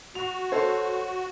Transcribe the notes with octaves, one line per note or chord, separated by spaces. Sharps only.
F#4 F7
A4 C5 C#5